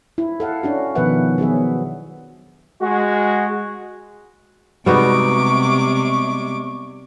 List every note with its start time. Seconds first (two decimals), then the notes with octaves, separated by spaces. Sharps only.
0.18 E4
0.40 A4 F5 F#5
0.63 C#4 D4 F#4
0.95 B2 D#3 F3 B4 E5 F#5
1.38 F#3 B3 G#4 E5
2.81 G#3 F#4
4.86 C3 G3 G#3 B3 D#4 F#4 C#6 D6